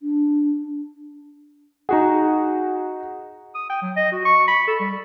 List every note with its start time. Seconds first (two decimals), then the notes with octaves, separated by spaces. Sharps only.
0.01 D4
1.89 D#4 F#4 G#4 F#5 A#5
3.55 D#6
3.70 G5
3.82 F#3
3.97 D#5
4.12 F#4
4.25 C#6
4.48 B5
4.67 A4
4.80 G3